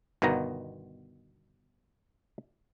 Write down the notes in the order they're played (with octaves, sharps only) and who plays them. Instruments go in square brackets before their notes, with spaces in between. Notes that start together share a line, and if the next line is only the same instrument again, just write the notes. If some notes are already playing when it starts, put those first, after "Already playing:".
[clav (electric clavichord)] G1 B2 D#3 B3 A#5